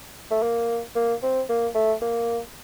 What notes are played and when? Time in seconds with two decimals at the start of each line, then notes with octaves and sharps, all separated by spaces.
0.31 A3
0.43 A#3
0.96 A#3
1.23 C4
1.49 A#3
1.75 A3
2.02 A#3